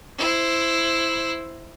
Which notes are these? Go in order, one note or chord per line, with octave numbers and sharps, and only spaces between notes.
E4 C5